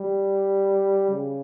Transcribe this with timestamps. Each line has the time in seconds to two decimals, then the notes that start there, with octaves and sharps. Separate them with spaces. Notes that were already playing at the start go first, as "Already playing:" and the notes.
Already playing: G3
1.10 C#3